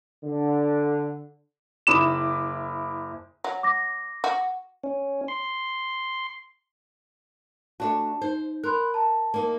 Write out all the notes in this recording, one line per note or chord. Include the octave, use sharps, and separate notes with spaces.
D3
F#1 E4 B5 D6 D#6 E7
F#3
D6 A#6
F#4
C#4
C6
A3 D4 F#4 A5
D#4 C5
A#4 B5 C6 F#6
A5 A#5
A#3 D#4